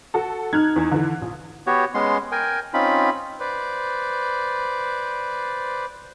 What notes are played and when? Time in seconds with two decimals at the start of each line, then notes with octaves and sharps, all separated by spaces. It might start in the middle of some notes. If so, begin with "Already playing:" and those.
0.14 F#4 A4
0.53 D#4 F6 F#6 G#6
0.76 E2
0.92 D3 E3
1.22 A#1
1.67 B3 F#4 G4 C#5
1.94 G#3 B3 C#4 C6
2.32 A#4 G5 G#5
2.74 C4 C#4 D#4 F4 B5
3.40 B4 C5 D5